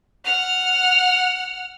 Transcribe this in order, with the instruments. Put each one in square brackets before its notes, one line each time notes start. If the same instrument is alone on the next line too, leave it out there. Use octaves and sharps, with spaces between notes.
[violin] F#5 F6